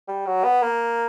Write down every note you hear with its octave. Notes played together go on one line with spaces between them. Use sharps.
G3
F#3
B3
A#3